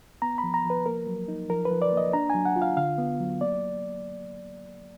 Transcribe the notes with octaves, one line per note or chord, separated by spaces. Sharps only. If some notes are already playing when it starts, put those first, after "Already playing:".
B3 A#5
B5
F3
A#5
F3
B4
A#3 A#4
F#3
D#4
F3 A#4
B4
F3
D5
A#3
D#5
D4 A#5
F#3 G#5
F#5
F4
F5
D3 F5
B3
F#3
A#3 D5